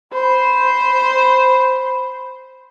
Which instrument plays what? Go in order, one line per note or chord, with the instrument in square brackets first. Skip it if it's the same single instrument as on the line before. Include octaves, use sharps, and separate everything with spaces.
[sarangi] C5 [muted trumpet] B5